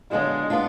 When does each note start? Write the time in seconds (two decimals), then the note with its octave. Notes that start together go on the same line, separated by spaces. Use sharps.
0.11 D3 F#3 G#3 B3 D4 F4
0.50 B3 D4 F4